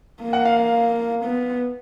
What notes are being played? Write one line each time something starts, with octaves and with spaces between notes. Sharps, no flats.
A#3
F#5
F5
F5
B3